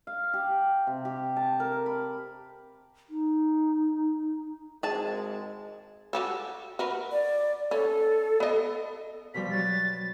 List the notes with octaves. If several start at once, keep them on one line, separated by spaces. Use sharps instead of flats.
F5
G4
C3
G4
A5
A#4
B5
D#4
G#1 G#3 G#4 A5
F#4 G4 A4
F#4 A#4 B4
D5
C#4 A4
B3 D#5
B2 F3 G3 B6
F#3 G3 A6